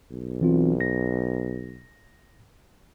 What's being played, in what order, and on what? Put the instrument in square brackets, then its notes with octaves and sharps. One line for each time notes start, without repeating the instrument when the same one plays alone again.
[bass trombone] B1
[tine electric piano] E3 C4 F4
A#6